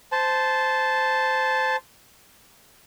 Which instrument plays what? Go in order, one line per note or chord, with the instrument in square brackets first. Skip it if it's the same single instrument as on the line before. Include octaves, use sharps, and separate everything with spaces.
[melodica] C5 A5